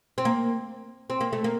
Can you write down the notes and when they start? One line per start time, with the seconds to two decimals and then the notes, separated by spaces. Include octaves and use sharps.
0.18 C4
0.25 A#3
1.10 C4
1.21 A#3
1.33 A3
1.44 A#3